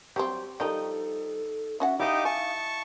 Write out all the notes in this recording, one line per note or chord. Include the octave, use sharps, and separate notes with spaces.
F#3 G3 C4 G4
D#3 F3 G3 D#4 A4 G5
C#4 F#4 E5 F#5
D#4 E4 G4 D#5 F5 D6
G#5 A5 C#6